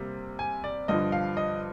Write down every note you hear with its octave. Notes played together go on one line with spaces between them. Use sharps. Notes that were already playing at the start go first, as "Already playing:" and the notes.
Already playing: C3 G3 A#3
G#5
D5
G2 D3 F3 D#5
F5
D#5